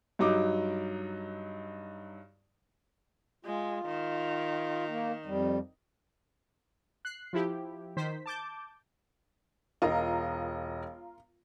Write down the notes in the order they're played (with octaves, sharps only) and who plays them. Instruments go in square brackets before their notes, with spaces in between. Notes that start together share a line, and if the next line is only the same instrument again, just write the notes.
[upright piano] G2 F#3 D#4 D6
[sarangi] G#3 [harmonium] F4
[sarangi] D#3
[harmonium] A#3
F2 G3
[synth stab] F#6 C7
F3 E4 G4
D#3 C5 B6
A5 D6 G6
[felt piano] E1 D#5 [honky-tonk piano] F4 A#4 A#5